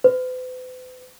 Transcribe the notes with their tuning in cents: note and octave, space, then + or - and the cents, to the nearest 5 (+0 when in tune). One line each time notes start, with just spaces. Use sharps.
B4 +45